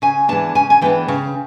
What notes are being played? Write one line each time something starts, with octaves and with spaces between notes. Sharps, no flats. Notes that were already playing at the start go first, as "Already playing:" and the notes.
C#3 G#5
E3 G#3 B3 D4 A5
C#3 G#5
G#5
E3 G#3 B3 D4 G5
C#3